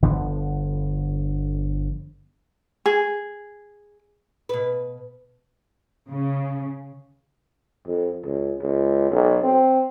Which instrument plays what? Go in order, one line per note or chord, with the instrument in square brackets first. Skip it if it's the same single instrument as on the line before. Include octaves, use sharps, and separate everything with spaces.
[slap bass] G1 D3 F3 B3
[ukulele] G#4
[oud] B2 B4
[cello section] C#3
[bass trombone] F2
C#2
C#2
B1
C4